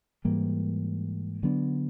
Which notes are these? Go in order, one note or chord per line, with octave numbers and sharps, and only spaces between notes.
G#2 E3 G3 A#3
D3 F#3 B3 D4